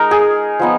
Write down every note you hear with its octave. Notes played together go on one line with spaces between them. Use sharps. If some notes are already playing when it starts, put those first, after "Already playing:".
Already playing: G#3 D#4 A#4
G#4
F3 B3 D#4